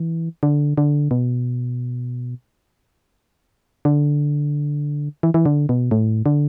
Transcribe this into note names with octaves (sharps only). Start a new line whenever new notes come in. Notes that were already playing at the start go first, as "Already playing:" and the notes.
Already playing: E3
D3
D3
B2
D3
E3
E3
D3
B2
A2
D3